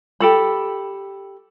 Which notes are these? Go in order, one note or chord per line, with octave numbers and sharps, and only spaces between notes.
G4 A4 B5